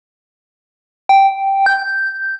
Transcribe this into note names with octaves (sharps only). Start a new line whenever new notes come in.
G5
G6